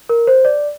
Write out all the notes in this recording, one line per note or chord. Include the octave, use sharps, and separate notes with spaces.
A#4
C5
D5